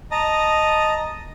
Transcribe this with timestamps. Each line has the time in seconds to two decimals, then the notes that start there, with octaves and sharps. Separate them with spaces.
0.11 D#5 A5 A#5